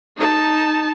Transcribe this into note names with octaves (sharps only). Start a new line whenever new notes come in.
D#4 A5